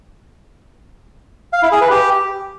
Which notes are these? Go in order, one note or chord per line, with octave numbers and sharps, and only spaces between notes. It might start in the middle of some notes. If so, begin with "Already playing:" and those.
F5
E4
G#4
B4
G4